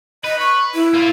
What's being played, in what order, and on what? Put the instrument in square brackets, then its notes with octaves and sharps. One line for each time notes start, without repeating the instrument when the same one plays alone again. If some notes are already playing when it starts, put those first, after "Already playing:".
[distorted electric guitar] B4 [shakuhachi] D#5
[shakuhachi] C#6
E4
[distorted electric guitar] A#3 F4